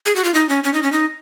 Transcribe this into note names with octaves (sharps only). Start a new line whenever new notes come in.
G#4
F#4
F4
D#4
C#4
C#4
D#4
C#4
D#4